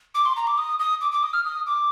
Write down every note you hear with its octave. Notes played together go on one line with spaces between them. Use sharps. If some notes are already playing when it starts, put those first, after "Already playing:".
D6
C6
A#5
D6
D#6
D#6
D6
D6
D#6
F6
D#6
D6